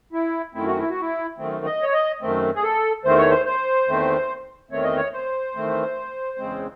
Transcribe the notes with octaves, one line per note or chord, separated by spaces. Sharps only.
E4
F#2 D#3 A3 C4 E4
F#4
E4
F#4
E4
F#2 D#3 A3 C4
D#5
C#5
D#5
F#2 D#3 A3 C4
G#4
A4
E2 D#3 A3 C4 C5
C#5
C5
C5
E2 D#3 A3 C4
E2 D#3 A3 C4 C#5
D#5
C#5
C5
E2 D#3 A3 C4
E2 C#3 G#3 C4